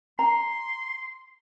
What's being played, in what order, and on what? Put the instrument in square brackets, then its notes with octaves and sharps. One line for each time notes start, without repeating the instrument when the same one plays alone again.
[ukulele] A#5 [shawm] C6